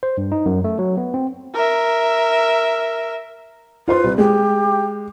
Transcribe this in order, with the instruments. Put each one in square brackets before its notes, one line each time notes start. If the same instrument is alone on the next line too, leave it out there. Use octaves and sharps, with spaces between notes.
[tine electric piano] C5
G2
D#4
F#2
A3
F#3
B3
C4
[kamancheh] A#4 E5
[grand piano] F4 C5 C6 [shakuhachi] B4
[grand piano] C2
[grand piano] G#3 [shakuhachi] G4